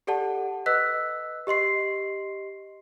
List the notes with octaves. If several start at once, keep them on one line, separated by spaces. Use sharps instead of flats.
G4 A4 D5 F#5 A5
B4 D#5 E6 F#6 B6
G4 D#5 C6 C7